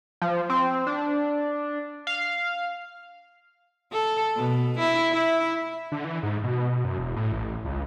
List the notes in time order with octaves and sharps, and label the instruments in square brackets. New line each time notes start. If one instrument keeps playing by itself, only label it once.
[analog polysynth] F3
C4
D4
F5
[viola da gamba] A4
B2
E4
E4
[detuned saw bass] D3
E3
G#2
B2
F#2
E1
A2
A1
C#2